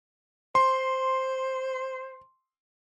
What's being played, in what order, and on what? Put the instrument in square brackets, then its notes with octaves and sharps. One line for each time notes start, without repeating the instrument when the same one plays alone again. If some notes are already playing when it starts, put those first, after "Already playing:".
[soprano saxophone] C5 [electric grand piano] C6